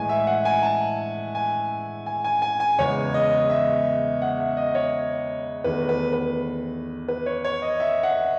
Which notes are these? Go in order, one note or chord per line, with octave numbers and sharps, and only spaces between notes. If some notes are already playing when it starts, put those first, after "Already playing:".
Already playing: A2 E3 G#3 G#5
E5
F#5
G#5
A5
G#5
G#5
G#5
G#5
G#5
E2 C#3 G#3 B3 C#5
D#5
E5
F#5
E5
D#5
C#5
E2 D#3 A3 B4
B4
B4
B4
C#5
C#5
D#5
E5
F#5